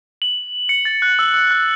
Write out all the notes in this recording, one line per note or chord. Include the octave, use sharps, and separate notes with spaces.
F#7
C#7
A6
F#6
E6
E6
F#6